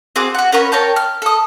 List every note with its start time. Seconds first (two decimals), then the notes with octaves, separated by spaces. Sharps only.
0.16 C4 F#4 G#4 D6
0.34 F#4 F#5
0.52 C#4 A#4 B4 C#5
0.72 A#4 C#5 G5 A5
0.96 F6
1.22 A4 D#6